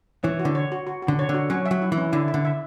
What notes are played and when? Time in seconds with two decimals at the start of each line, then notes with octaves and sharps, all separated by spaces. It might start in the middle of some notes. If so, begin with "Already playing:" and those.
0.24 E3 C#5
0.40 F#4
0.45 D3
0.55 C#5
0.72 F#4
0.87 F#4
1.02 F#4
1.08 D3
1.19 C#5
1.29 D3
1.34 F#4
1.50 F#3 C#4
1.66 E5
1.71 F#3
1.82 E4
1.92 E3
1.98 C#4
2.12 D3 E4
2.28 E5
2.34 D3
2.45 E5